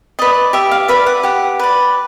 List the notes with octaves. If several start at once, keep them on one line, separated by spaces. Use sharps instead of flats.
B4 D5 D#5
G4 E5
F5
B4 D5 E5
F#5
G4 F#5
B4 D5